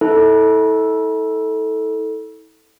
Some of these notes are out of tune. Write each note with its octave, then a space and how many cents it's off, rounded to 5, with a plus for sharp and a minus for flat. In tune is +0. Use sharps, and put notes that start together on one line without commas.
E4 -40 A4 +0